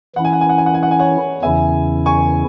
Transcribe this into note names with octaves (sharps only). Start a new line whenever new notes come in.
E3 C#4 E4 F#5
G#5
F#5
G#5
F#5
G#5
F#5
G#5
F#5
G#5
C#5 F#5
E2 C#3 E3 C#4 E4 E5 G#5
G#5 C#6